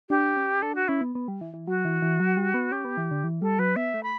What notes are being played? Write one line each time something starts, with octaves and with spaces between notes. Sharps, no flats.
D4 G4
C#4
D4 A4
F#4
C#4 E4
B3
B3
G3
E3
E3
F#3 F#4
E3
E3
F#3
G3
B3
C#4 G4
B3
E3
D3
E3
G3 A4
F#3 B4
B3 E5
A3
B5